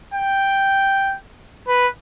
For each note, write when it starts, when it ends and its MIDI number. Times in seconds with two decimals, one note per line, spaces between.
0.14 1.15 79
1.68 1.88 71